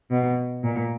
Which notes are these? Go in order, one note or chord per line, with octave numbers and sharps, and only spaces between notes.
B2
A#2